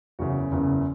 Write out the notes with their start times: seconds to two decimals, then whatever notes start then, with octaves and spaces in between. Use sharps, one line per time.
0.19 F#1 E2 C#3 F#4
0.52 F#1 E2 C#3